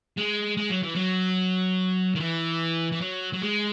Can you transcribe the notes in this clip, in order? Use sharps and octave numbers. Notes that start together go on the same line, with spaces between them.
G#3
G#3
F#3
E3
F#3
D#3
E3
E3
F#3
F#3
G#3